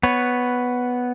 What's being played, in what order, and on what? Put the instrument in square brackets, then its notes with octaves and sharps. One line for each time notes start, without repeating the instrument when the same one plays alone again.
[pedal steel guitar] B3 B4 C#5